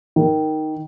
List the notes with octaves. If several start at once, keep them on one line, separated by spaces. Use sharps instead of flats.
D#3